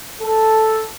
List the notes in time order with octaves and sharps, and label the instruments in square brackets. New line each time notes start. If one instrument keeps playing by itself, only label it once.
[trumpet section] A4